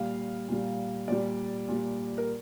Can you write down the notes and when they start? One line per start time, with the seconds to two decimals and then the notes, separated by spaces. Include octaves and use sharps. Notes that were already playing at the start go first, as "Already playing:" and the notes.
Already playing: A#2 G3 F5
0.48 A#2 G3
1.08 A#2 G3 D5
1.68 A#2 G3
2.18 A#4